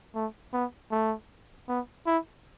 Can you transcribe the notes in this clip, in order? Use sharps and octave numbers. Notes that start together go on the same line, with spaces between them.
A3
B3
A3
B3
E4